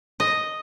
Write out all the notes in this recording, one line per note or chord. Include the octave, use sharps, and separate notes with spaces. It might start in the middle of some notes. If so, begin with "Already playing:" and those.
D#5